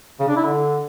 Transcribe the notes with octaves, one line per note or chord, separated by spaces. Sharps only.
C#3
D4
E4
D3